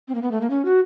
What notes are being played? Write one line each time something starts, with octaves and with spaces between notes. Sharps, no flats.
C4
A#3
B3
A3
A#3
C#4
F#4